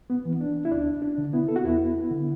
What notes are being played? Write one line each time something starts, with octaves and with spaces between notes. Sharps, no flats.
B3
E3
D4
E4
D2 D4
D4
D3
B3 E4
A4
F#4
E2 B3 E4
D3